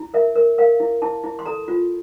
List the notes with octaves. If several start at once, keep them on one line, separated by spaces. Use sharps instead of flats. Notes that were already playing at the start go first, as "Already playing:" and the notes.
Already playing: E4
A#4 E5
A#4
A#4 F5
E4
E4 A5
E4
C6
A4 A#5
F4